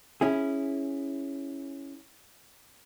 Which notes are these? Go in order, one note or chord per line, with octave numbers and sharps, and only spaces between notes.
C#4 E4 G#4